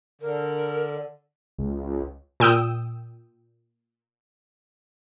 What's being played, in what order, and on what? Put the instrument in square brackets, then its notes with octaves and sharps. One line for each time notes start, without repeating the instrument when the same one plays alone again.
[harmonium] D3 [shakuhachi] A#4
[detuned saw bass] C#2
[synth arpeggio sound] A#2 G5 D#6 E6